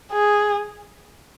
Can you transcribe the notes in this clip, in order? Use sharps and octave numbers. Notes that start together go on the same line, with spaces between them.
G#4